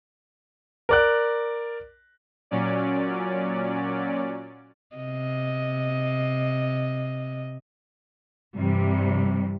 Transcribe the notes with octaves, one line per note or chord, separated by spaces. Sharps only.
A#4 D5 F#6
A#2 F#3 C#4 D5
C3 D#5
G2 C3 E3 G3